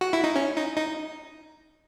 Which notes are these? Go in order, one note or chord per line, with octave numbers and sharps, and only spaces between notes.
F#4
E4
D#4
C#4
D#4
D#4